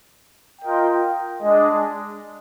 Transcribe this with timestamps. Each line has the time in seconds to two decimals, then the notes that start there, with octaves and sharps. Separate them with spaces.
0.62 F4 A#4 D#5 G5
1.40 G#3 D4 G#4 D#5